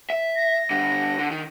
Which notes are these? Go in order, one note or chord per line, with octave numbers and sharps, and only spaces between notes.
E5
A#6
G2 D3
D3
D#3